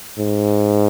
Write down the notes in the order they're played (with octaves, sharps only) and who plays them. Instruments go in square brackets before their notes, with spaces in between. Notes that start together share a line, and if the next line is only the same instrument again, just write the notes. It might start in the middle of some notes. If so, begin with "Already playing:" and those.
[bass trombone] G#2